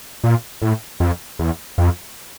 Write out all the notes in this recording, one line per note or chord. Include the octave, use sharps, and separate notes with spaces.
A#2
A2
F2
E2
F2